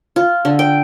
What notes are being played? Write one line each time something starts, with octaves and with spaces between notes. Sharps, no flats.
F4
D3
G5